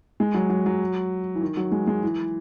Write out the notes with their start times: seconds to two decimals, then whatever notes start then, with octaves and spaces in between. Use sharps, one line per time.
0.20 G#3
0.34 F#3
0.49 F#3
0.66 F#3
1.35 E3
1.41 D#3
1.57 F#3
1.72 G#3
1.87 G#3
2.03 E3